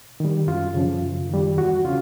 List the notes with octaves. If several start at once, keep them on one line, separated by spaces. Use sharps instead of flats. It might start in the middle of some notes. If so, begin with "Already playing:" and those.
D#3 G3
F#2 F4
C#3 F3
F#2
D#3 G3
E2 F#4
C#3 F4